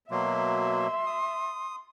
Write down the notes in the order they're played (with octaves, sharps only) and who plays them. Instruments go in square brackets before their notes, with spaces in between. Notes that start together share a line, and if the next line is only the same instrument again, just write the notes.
[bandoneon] B2 F#3 A#3 [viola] E5 [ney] C6
[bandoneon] D#6